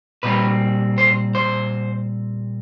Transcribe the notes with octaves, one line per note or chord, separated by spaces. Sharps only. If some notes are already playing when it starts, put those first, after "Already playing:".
A#2 G3 C4 B4
C5
C5